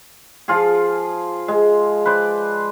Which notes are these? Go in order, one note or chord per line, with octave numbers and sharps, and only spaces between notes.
F3 F4 G#4
G#3
B4 C5 D5